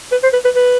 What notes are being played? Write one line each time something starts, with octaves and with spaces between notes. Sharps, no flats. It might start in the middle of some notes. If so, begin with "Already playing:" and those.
B4
C5
B4
B4
B4